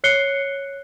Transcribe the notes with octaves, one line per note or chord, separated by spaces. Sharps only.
C#5 F#6 C7 C#7 G7